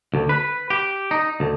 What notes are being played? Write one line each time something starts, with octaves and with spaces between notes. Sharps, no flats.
D2
B4
G4
D#4
D2